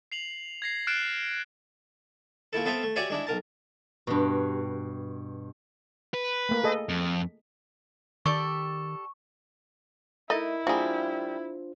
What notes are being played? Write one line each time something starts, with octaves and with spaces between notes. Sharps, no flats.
C7 F7 F#7
G#6 A#6 C7
F6 F#6 A6 C7 D7 E7
A#2 A3 E4 A4
B3 C4 A4 E5 F5 G5
A3
F#4 G4 C#5 D5 E5 G#5
G#3 D4 E4
B1 A#4 A5
G2 B2
B4
A3 A#3
G#4 A4 D#5
F2
D#3 G4 A4 D5 C#6
A3 D#4 E4 A#4 D#5
G3 A#3 D4 F4 F#4 G#4 C5